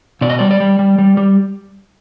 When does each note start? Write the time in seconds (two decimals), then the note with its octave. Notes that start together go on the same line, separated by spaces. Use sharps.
0.21 B2 D5
0.30 D#5
0.39 G3 D5
0.51 D5
0.60 G3
0.79 G3
0.98 G3
1.17 G3